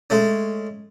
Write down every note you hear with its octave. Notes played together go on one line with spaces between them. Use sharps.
G#3 A3 C#4